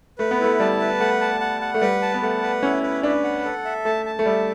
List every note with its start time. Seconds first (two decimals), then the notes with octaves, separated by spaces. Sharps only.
0.18 A3 B4
0.31 B3
0.40 A3 E4
0.60 G3 A5
0.81 B4
1.00 A3 F#5
1.21 A5
1.40 F#5
1.61 F#5
1.74 A3
1.81 G3 B4
2.02 A5
2.14 B3
2.23 A3 F#5
2.42 B4
2.63 C#4 E4
2.83 B4
3.03 D4 B4
3.24 F#5
3.45 A4
3.65 E5
3.85 A3 A5
4.06 A5
4.19 A3
4.26 G3 E5